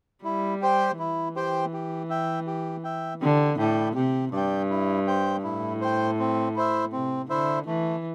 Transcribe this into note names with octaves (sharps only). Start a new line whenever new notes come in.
G3 E4
G4 C5 G5
E3 E4
G4 C5 G5
G4
E5 G5
G4
E5 G5
D3 G4
A2 D5 G5
C3 G4
G2 D5 G5
E4
C5 G5
A2 E4
C5 G5
C4
E4 C5 E5
C3 C4
D3 E4 C5 E5
E3 A3